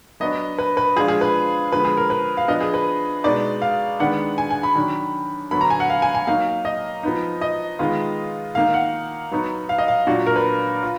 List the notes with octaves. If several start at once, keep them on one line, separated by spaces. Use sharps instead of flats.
F#3 B3 D4 D#5
B4
B4
F3 G#3 D4 F4 G#4
G#4
B4
D3 F3 G#3 B3 B4
G#4
A#4
B4
F5
F3 B3 D4 D#5
G#4
B4
B2 G#3 B3 D#4 D5
F5
D#3 G#3 B3 D4 F#5
G#5
G#5
B5
D#3 F#3 D4
D3 F#3 B3 B5
A#5
G#5
F#5
F5
G#5
G#5
F#3 A#3 D#4 F5
D#5
F3 B3 D#4
D#5
D#3 G#3 B3 F4
D#3 A#3 D#4 F5
F#5
F#3 B3 D#4
F5
D#5
F5
A#2 F#3 D4 F4 F#4
A#4
B4
F4